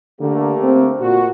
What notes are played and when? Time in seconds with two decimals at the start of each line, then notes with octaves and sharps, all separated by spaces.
0.20 D3 A3 A#3 G4
0.63 C4
1.00 A#2 F#4